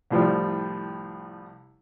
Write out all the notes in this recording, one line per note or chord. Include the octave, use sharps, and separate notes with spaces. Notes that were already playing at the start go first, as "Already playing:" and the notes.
C2 A2 F3 G3